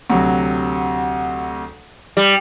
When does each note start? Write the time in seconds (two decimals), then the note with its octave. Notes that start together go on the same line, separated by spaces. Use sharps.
0.10 D2 C3 F#3
2.17 G3